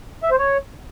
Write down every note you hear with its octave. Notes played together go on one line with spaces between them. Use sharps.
E5
C5
C#5